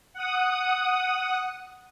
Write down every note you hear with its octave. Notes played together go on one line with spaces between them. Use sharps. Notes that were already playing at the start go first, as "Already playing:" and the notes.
F#5 D#6